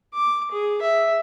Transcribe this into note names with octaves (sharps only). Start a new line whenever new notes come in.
D6
G#4
E5